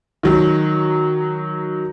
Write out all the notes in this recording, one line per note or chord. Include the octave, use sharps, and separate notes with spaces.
D#3 F#3